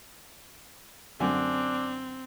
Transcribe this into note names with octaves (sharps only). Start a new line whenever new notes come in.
F#2 D3 C4 D4 G#5